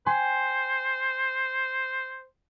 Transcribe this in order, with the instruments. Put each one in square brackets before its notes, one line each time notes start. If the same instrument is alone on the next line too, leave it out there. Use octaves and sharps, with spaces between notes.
[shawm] C5 [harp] G5 G#5 C6